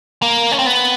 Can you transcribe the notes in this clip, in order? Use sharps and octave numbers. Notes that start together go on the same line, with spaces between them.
A#3
C#4
C4
B3